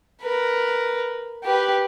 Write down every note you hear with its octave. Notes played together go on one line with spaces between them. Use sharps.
A#4 B4
G4 B4